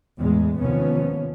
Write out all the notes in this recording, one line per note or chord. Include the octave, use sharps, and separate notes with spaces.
E2 A2 G#3
D#2 C3 F3 B3 C#4